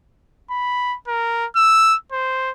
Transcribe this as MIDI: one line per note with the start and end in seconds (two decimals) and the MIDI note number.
0.50 0.96 83
1.07 1.46 70
1.56 1.96 88
2.12 2.51 72